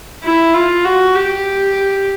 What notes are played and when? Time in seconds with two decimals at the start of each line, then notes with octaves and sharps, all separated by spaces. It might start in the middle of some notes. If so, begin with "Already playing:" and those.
0.23 E4
0.54 F4
0.85 F#4
1.15 G4